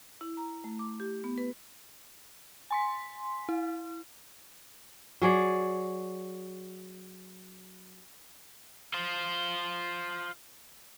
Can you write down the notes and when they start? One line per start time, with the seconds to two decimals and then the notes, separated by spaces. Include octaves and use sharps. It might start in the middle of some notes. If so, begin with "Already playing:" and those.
0.21 E4
0.37 A#5
0.64 A3
0.79 D6
1.00 G4
1.24 B3
1.38 B4
2.71 G#5 C6 B6
3.49 E4
5.22 F#3 G#4 D5
8.94 F4 C5